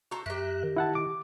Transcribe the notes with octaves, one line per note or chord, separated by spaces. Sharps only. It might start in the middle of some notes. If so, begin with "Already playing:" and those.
F#4 A4 C5 A#5
F#2 G4 A#4 E5 F#6
D#3
E4 F#5 A5
D6